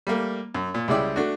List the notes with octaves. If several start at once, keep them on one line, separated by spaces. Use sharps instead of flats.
G3 A3 A#3
F#2
A#2
C#2 G3 G#3 E4 D5 G5
A3 D4 F#4